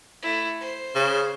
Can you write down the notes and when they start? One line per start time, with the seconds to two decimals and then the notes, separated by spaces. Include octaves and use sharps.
0.22 A3 E4
0.60 C5
0.95 C#3